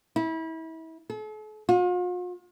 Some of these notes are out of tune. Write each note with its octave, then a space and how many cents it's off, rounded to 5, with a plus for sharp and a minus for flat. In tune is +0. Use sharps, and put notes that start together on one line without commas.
E4 -30
A4 -45
F4 +45